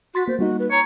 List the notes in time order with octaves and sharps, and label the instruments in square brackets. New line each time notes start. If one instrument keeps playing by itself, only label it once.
[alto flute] F#4 [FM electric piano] C6 A6 B6
[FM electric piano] A#3 [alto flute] C5
[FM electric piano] G3 A#3 D#4 [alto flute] F#4
[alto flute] B4
[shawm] C#5 [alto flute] A#5